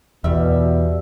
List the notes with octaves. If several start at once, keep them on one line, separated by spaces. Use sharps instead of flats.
E2 B2 G3 E5